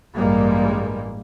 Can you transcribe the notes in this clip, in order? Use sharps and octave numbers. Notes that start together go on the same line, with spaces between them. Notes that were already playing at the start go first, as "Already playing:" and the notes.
A1 G2 G3 G#3 A#3